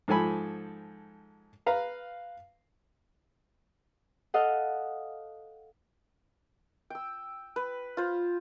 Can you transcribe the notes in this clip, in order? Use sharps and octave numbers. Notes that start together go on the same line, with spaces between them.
G#2 F3 A4 G#5 B5
B4 F5 A#5
A4 D#5 F5 F#5
G5 E6
B4
F4 C5